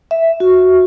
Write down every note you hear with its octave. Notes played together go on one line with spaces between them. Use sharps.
E5
F#4